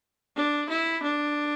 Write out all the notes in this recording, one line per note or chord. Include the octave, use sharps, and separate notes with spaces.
D4
E4
D4